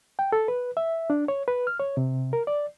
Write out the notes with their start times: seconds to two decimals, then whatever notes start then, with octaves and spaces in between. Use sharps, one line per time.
0.19 G5
0.32 A4
0.48 B4
0.77 E5
1.10 D4
1.28 C#5
1.48 B4
1.67 F6
1.80 C#5
1.97 C3
2.33 A#4
2.47 D5